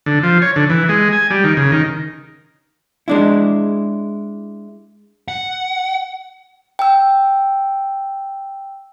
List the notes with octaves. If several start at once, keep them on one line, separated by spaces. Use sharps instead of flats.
D3
F3
C#5
D3
E3
G#3
G#5
G3
D#3
C#3
D#3
G#3 D4 E4
F#5
G5 E6